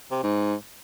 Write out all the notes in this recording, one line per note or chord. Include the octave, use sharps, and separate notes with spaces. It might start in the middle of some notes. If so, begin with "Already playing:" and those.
C3
G#2